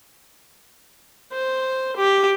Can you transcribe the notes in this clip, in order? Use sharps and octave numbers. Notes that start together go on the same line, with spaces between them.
C5
G4